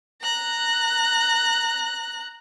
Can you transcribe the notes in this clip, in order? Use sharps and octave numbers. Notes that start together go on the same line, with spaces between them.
A#5 F#6